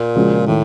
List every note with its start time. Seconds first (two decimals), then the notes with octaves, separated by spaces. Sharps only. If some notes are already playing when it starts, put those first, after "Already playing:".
Already playing: A#2
0.16 C#3 F3 G#3 C#4 F#4
0.47 A2 D#3